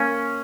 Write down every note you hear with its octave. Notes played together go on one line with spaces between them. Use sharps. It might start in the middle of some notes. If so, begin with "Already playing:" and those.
Already playing: A#3 C#4